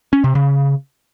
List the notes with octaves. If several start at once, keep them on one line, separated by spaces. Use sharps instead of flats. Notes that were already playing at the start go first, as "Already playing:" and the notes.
C#4
C3
C#3